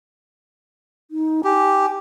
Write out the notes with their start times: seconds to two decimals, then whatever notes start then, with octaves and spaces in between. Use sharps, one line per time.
1.11 D#4
1.44 G4 G#5